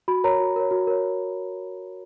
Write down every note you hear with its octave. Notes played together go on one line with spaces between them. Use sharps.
F#4 B5
A#4 C#5 A#5
F#4
A#4 C#5
F#4
A#4 C#5